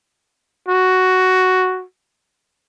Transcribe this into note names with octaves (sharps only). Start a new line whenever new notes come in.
F#4